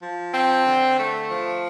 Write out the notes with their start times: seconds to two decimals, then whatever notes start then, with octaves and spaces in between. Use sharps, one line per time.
0.02 F3
0.33 C4
0.66 D3
0.99 A3
1.31 F3